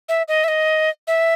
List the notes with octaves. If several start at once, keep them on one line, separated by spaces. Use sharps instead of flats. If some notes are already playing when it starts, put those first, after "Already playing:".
E5
D#5
E5
D#5
E5